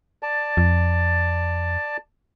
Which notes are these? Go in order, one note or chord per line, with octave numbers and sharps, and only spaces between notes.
D5 A5
F2